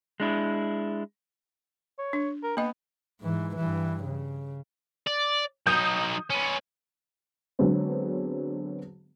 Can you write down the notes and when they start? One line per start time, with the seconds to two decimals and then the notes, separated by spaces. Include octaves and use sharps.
0.20 G#3 D4 E4
1.99 C#5
2.13 D4
2.43 A#4
2.57 A#3 B3 D#5
3.22 G#2 E3
3.56 G2 E3
4.04 C#3
5.07 D5
5.67 F#3 D#4 D#6 G6
6.30 C#4 B4
7.59 D3 F#3 G#3 B3 C4